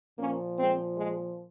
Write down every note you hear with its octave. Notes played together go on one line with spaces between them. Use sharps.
A#2 F3 A#3 C#4
G#3 C4
G#3